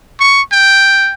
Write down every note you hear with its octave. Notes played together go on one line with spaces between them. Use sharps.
C#6
G5